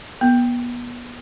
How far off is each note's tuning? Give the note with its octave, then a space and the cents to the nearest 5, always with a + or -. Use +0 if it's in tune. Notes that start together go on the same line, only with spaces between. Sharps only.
B3 -30